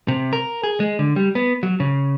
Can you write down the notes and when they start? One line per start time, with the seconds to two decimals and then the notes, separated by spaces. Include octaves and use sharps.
0.08 C3
0.33 A#4
0.63 G#4
0.80 G#3
0.99 D3
1.16 G3
1.35 B3
1.63 F#3
1.80 C#3